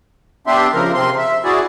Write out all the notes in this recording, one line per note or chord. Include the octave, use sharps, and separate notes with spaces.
B3 D4 G4 E5 C6
C#3 F3 A#4
C3 C4 C6
E5
E4 F#4 G#4 D5